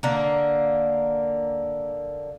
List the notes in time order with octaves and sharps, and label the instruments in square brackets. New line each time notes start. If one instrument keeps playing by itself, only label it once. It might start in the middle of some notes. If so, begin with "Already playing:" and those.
[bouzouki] D3 A#3